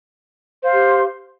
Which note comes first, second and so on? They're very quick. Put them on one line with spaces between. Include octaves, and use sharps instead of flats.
C5 F5 C6 G4